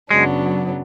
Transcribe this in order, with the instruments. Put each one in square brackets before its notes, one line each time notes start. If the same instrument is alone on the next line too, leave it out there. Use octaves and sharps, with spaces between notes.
[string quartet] F#2 C#3 F#3 B3 D4 [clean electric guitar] G#3